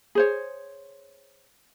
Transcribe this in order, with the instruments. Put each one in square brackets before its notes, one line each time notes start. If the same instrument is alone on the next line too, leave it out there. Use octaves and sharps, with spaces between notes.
[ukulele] G#4 C5 C#5